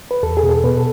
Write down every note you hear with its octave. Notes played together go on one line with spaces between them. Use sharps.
B4
E2 A4
G#4
B2
A4
B2 B4
A4